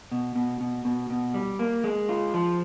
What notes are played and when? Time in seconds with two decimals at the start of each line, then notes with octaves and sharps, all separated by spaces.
0.12 B2
0.36 B2
0.61 B2
0.85 B2
1.10 B2
1.34 G3
1.59 A#3
1.84 G#3
2.09 F4
2.34 F3